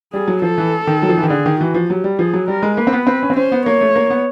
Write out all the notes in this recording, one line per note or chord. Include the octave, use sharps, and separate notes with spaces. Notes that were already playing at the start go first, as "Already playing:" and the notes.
G3 G#4
F#3
F3 A4
E3
D#3
F#3
F3
E3
D#3
D3 G#4
D#3
E3 F#4
F3
F#3 G4
G3
F3 G#4
F#3
G3 A#4
G#3
A#3 B4
C4
B3
C4
C#4
C4
C#4 C5
B3
A#3 C#5
A3
A#3
B3